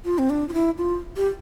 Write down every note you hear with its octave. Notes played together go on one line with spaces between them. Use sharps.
F4
C4
D4
F4
E4
F4
G4